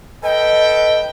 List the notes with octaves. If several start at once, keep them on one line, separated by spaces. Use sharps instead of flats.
A4 B4 D#5 G5